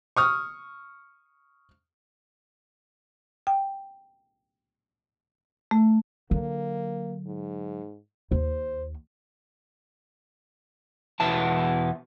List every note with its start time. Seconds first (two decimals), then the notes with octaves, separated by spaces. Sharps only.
0.17 C#6 D#6 F6
3.47 G5
5.71 A3
6.31 D3 F#3 A#3
7.26 G#2
8.31 D#2 C5
11.20 E2 B2 B3 E4 A5